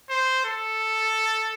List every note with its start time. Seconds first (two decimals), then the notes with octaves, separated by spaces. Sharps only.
0.10 C5
0.45 A4